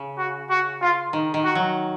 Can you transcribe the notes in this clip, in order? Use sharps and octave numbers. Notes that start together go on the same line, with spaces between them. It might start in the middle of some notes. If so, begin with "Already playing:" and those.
Already playing: C#3
F#4
F#4
F4
D#3
D#3
F#4
F#3